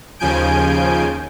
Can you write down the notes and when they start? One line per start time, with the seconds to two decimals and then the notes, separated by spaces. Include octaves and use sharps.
0.19 D#2 C#3 F3 G#5 G6 D7